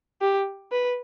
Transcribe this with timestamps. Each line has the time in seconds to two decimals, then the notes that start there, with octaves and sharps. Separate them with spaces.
0.21 G4
0.72 B4